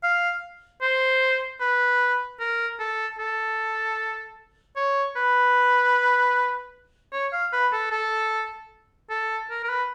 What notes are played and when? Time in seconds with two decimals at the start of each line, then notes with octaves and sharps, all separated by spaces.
0.03 F5
0.81 C5
1.61 B4
2.40 A#4
2.80 A4
3.19 A4
4.76 C#5
5.16 B4
7.12 C#5
7.32 F5
7.53 B4
7.72 A4
7.91 A4
9.10 A4
9.50 A#4
9.64 A#4
9.69 B4